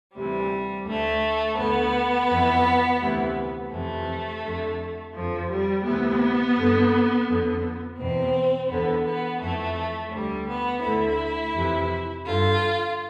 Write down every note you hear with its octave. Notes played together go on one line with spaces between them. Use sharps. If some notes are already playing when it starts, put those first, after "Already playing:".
D2 C3 E3 G3
D2 D3 A3
D2 D3 B3
F2 E3
D2 C3 E3
F2 C3 E3 A3
F2 D3
F2 D3 F3
G3
D2 C3 E3 B3
G2 D3
F2 D3
E2 B2 C4
E2 D3 B3
B3
F2 E3 A3
D2 D3 G3
B3
D2 D3 E4
F2 C3 E3
G2 D3 F4